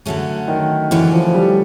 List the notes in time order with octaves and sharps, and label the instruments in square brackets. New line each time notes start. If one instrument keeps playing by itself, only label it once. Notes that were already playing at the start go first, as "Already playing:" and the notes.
[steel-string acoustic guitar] D3 F#3 A3 C#4
[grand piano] D#3
[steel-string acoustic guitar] D3 F#3 A3 C#4 [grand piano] E3
[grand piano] F3
G3